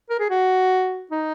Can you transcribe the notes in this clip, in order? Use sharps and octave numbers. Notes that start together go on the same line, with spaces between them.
A#4
G#4
F#4
D#4